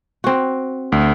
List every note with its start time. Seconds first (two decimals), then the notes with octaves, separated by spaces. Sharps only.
0.24 C4 F#4
0.92 D2